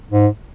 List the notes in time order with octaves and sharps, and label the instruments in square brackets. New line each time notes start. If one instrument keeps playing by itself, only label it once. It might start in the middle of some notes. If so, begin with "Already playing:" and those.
[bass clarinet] G#2